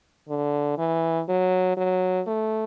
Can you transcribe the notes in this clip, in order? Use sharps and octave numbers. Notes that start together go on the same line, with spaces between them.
D3
E3
F#3
F#3
A3